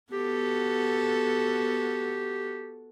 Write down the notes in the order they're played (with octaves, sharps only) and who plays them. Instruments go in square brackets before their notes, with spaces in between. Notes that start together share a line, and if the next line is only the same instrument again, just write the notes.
[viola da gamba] B3 F#4 A4 [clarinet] G4